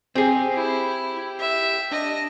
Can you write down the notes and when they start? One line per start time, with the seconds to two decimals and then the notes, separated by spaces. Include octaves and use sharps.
0.15 C4 G4 G#4
0.54 E4
1.40 E5
1.92 D4 D#5